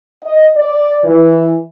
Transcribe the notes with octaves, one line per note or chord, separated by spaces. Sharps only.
D#5
D5
E3